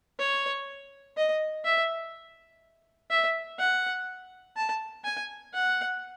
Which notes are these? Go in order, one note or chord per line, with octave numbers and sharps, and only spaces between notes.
C#5
D#5
E5
E5
F#5
A5
G#5
F#5